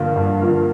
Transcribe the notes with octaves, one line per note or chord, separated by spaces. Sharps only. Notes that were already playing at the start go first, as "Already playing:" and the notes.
Already playing: G2 D3 F3 A#3 F4
G2
D3 F3 A#3 F4